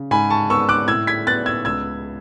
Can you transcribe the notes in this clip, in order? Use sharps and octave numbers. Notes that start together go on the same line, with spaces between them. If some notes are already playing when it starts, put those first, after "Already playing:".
Already playing: C#3
G#2 G#5 B5
A5 C#6
B3 C#6 E6
D6 F#6
A2 E6 G#6
G#6 B6
B3 F#6 A6
E6 G#6
C#2 E6 G#6